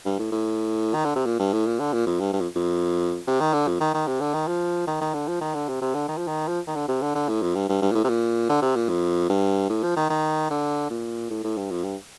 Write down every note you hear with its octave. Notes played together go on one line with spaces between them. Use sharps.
G2
A2
A2
D#3
D3
C3
A#2
G2
A2
A#2
D3
A#2
F2
G2
G2
F2
F2
C3
D#3
D3
F2
D#3
D#3
C3
D3
D#3
F3
D#3
D#3
D3
F3
D#3
D3
C3
C3
D3
D#3
F3
D#3
F3
D#3
D3
C3
D3
D3
A2
F2
G2
G2
G2
A#2
A2
C3
A#2
D3
C3
A#2
F2
G2
A2
F3
D#3
D#3
D3
A#2
A2
A2
G2
F2
G2